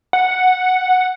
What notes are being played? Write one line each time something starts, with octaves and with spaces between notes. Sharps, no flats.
F#5